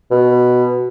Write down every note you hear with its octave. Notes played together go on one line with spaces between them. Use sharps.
B2